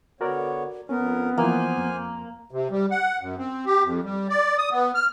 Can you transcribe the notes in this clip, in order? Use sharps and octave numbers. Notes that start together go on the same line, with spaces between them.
D3 B3 F#4 A#4 C#5 D5
F2 B3 C#4 A#4
E3 F3 A#3 C5 G#5
F2
C3
G3
F#5
F#2
C4
G4
F2
G3
D5
D#6
B3
F6